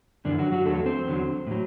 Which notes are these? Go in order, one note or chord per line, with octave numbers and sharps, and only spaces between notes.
F#2 D3 E3 D4
F#3 F#4
F#3 F#4
E2 D3 F#3 A3 A4
C4 C5
E2 D3 F#3
A2 F#3